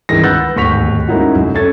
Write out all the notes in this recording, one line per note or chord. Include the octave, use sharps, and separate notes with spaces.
C#2 G2 D#3 E3 G#4 A#6
B4 F#5 E6 F#6 G6 A6
D1 D#2 G#2 C#6 B6 F7
G#3 A#3 C#4 D#4 E4 F#4
F1 F#2
C#4 A4 G#6 A6